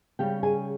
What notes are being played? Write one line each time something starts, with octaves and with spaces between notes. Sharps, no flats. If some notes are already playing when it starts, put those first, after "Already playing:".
C#3 G3 C#4 G4 G5
G#4 G#5